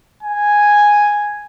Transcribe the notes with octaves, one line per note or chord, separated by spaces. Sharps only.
G#5